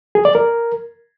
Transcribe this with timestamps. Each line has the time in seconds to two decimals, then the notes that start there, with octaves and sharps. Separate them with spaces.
0.15 G#4
0.25 D5
0.35 A#4